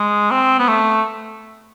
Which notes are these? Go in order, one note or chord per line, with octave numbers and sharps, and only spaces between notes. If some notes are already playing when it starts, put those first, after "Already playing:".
Already playing: G#3
C4
B3
A3